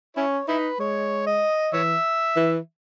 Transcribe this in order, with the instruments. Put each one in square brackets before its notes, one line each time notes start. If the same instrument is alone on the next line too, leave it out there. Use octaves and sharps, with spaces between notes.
[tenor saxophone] C#4 [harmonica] E4 C#5
[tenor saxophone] D#4 [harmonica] E4 B4
[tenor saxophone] G#3 [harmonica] C#5
[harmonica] D#5
[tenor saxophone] E3 [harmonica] C#5 E5
[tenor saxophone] E3